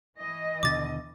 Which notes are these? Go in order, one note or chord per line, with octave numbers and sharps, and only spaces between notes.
E3 D#5
D#2 B2 D3 D6 A6